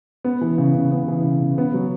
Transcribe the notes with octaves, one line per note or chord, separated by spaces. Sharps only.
B3
E3
C#3
C#3
B3
E3
C#3
C#3
B3
F#3